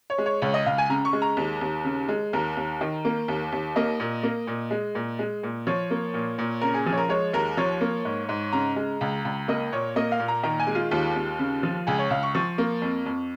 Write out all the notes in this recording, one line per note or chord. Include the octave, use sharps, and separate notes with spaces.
C#5
G#3
C#5
C#2 C#5
D#5
C#2 F5
G#5
C#3 A#5
C#6
G#3
A#5
D#2
D#2
C#3
G#3
D#2 A#4
D#2
D#3
A#3
D#2
D#2
A#3 D#5
A#2
A#3
A#2
G#3
A#2
G#3
A#2
F3 C#5
A#3
A#2
A#2
C#3 A#4
G#4
F3 G#4
C#5
A#4
G#3 C#5
D#2 A#4
F3 C#5
A#3
G#2
G#2
C#3 A#5
G#3
C#2
C#2
A#3 D#5
A#2 C#5
A#3 D#5
F5
A#2
A#5
D#3 A#5
G#5
G#3
F4
D#2 F4
D#2
C#3
F3
C#2 G#4
C#5
C#2 F5
C#6
F3 C#6
A#3
F2
F2